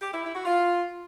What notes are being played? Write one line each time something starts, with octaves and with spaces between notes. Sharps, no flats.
G4
E4
E4
F#4
F4